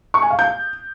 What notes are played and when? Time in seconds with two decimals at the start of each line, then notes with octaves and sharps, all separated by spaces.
0.14 C#6
0.22 G#5
0.30 F5
0.39 G6